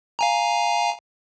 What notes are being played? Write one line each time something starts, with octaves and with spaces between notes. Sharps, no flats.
F5 G#5 A#5